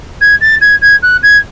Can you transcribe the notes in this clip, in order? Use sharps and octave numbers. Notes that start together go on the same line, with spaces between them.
G#6
A6
G#6
G#6
F#6
G#6